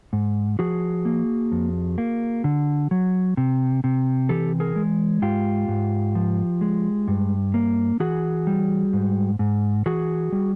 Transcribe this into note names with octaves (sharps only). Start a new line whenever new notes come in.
G#2
F3 F#4 G#4
A#3
F2
A#3
D3
F#3
C3
C3
E3 G4 A4
G#4 A#4
G#3
G#2 F4 G4
G#2
F3
G#3
G2
A#3
E3 F#4 G#4
G3
G#2
G#2
E3 F#4 G#4
G3